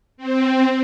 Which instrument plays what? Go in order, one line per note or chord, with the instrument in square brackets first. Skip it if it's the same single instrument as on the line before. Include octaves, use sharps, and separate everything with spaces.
[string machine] C4